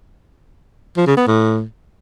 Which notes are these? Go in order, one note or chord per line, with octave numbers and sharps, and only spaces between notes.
F3
C#3
B3
A2